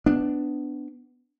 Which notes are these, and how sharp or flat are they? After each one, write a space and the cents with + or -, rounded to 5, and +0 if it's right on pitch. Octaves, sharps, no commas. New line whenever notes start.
B3 +20 D4 +0